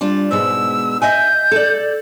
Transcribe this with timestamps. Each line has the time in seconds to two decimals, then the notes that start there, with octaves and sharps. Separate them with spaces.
0.01 G3 D4 F4
0.31 G#2 B2 G#3 E6
1.02 D#5 E5 G#5 G6
1.51 A4 D5